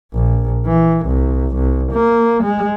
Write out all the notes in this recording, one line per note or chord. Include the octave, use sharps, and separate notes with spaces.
A#1
E3
C2
C2
A#3
G#3